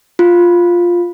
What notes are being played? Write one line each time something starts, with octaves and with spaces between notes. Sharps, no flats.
F4